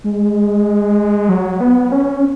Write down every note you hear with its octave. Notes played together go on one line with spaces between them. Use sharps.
G#3
F#3
B3
C#4